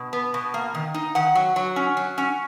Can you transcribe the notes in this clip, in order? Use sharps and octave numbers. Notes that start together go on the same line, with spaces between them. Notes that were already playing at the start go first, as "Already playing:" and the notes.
Already playing: B2
B3
B2
A#3
D#3
D#4
D#3 F#5
F#3
F#3
C#4
F#3
C#4